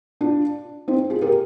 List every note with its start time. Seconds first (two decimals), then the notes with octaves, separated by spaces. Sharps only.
0.21 D4 F4
0.88 C4 D#4
1.10 F4 G#4
1.21 G4 A#4